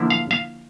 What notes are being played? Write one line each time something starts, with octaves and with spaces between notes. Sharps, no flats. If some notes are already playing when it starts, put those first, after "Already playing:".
Already playing: D3 F3 A#3 E4
F5
F5